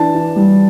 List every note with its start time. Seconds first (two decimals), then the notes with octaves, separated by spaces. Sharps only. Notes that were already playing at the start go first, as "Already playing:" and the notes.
Already playing: E3 D4 A5
0.15 E3
0.36 G3